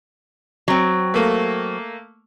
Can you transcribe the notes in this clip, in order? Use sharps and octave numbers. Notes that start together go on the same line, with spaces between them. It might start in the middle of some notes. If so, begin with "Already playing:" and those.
F#3 C4
A3 A#3